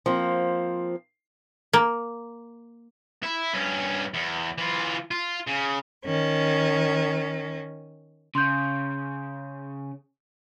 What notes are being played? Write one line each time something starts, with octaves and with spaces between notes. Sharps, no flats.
F3 A#3 C4
A#3
E4
G2 C#4
E2
E3 F4
F4
C#3
D#3 C#4
C#3 C6 G6